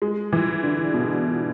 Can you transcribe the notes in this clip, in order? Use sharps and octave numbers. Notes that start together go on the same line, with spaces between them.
G#3
E3
D3
B2